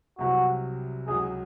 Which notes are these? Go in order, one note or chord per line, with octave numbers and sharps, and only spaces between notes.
C2 C3 F#3 F#4
C#2 C#3 F#3 G#4